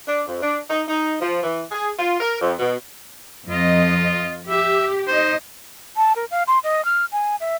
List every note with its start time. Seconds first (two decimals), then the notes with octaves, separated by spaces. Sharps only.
0.07 D4
0.28 F2
0.42 D4
0.70 D#4
0.88 D#4
1.21 F3
1.43 E3
1.72 G#4
1.98 F4
2.20 A#4
2.41 F2
2.59 B2
3.48 F2 F4 D#5
4.48 G4 E5
5.07 D#4 C5 D#5
5.97 A5
6.16 A#4
6.31 F5
6.48 C6
6.64 D#5
6.85 F6
7.12 G#5
7.40 E5